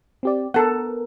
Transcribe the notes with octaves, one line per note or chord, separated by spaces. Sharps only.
C4 G4 D5
B3 A4 A#4 F#5